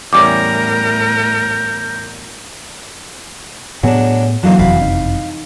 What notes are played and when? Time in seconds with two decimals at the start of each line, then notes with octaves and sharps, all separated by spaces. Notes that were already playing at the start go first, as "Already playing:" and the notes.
0.13 E2 A2 G3 C#4 A#4 D6 G6
3.83 A2 F#3 B3 D4 G#4
4.43 D3 E3 F#3 A#3 D#4
4.59 F#1 F2 C3 F5 B5
4.81 D#4